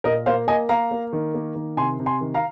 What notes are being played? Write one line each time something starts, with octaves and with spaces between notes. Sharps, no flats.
A#2 A#4 D#5
A#3 C5 F5
A#3 D#5 G#5
A#3 F5 A#5
A#3
D#3
A#3
D#3
C3 G#5 C6
C3
G#5 C6
D#3
F5 A#5